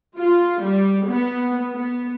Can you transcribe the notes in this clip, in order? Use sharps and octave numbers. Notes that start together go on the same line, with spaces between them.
F4
G3
B3
B3